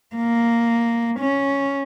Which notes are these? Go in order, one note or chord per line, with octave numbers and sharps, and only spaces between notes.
A#3
C#4